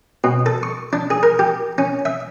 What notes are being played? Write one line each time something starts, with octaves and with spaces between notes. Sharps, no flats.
B2
A4
C#6
D4
G#4
A#4
G4
C#4
E5